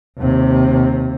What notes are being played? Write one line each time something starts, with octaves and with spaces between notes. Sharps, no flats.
D#2 C3